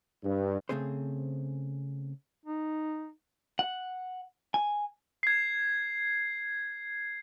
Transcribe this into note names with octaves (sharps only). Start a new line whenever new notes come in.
G2
C#3 A3 C4 G#4 C5
D#4
F#5
G#5
G#6 C7